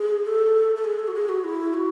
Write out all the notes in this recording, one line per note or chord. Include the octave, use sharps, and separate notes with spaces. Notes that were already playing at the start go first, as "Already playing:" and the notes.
Already playing: G#4
A4
A4
G#4
A4
F#4
G#4
F#4
E4
F#4